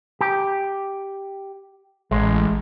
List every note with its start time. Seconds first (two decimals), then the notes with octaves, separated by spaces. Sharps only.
0.21 G4
2.11 A1 G#3